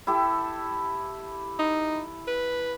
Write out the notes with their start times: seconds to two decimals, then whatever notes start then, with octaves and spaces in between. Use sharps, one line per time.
0.07 E4 G4 A4
1.59 D#4
2.28 B4